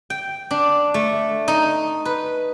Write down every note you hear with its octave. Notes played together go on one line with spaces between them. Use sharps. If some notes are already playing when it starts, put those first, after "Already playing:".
G5
D4
A3
D#4
B4